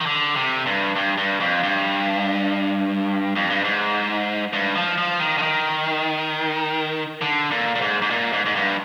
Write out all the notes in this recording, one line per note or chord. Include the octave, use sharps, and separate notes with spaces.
D#3
D3
C3
G2
G2
G2
F2
G2
F2
G2
G#2
G2
F3
F3
D#3
D3
D#3
D3
A#2
A#2
G#2
G#2
A#2
G#2
G#2
G2